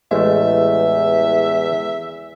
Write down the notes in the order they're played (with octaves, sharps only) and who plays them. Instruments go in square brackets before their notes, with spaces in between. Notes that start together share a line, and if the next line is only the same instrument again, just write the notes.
[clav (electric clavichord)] A1 A3 [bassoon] E2 [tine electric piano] G#3 [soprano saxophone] E5